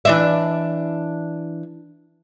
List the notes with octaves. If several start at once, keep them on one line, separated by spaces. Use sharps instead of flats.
E3 D4 E5